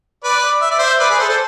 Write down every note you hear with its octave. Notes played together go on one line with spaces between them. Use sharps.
B4 D5
E5
D5
C5 E5
B4 D5
G#4 B4
A4 C5
A4 C5